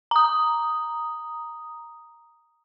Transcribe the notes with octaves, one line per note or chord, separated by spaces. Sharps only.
A#5 D#6